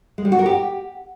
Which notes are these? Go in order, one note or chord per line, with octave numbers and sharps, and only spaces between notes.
G#3
G3
F#4
A#4
G4